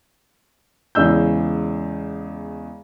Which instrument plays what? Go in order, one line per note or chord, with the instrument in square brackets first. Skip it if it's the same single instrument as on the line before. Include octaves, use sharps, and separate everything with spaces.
[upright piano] E2 C#3 G#3 E6 G6